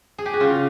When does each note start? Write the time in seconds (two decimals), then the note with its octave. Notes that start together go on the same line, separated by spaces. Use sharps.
0.18 G#4
0.26 G4
0.33 F#4
0.40 C#3 F4